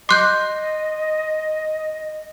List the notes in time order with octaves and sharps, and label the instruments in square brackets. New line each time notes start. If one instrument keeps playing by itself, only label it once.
[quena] D#5 [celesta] C6 C7 [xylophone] D6 F#6 G6